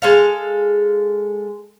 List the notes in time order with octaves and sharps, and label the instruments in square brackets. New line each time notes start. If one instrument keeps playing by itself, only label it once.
[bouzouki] G#3 A4 F5